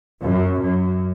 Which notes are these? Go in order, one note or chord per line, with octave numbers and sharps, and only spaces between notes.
F#2
F#2